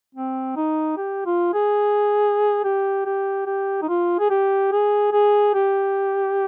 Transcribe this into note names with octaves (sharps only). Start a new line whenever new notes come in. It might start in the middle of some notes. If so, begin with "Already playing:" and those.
C4
D#4
G4
F4
G#4
G4
G4
G4
D#4
F4
G#4
G4
G#4
G#4
G4